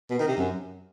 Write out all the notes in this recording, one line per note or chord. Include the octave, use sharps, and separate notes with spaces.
B2
D#3
C3
F#2